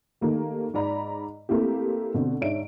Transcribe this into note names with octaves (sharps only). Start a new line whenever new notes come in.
D#3 A3 A#3 G4
G#2 D5 A#5 B5
A3 A#3 C4 E4 G4
B2 D3 C4
G#2 D4 C#5 E5 D7